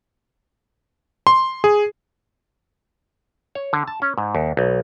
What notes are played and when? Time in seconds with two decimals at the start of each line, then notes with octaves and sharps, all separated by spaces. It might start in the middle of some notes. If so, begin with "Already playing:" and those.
1.27 C6
1.64 G#4
3.55 C#5
3.73 D3
3.88 A5
4.02 C#4
4.18 G#2
4.35 D#2
4.57 B1